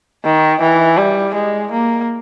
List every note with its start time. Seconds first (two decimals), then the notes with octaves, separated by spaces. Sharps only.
0.25 D#3
0.61 E3
0.97 G3
1.34 G#3
1.71 A#3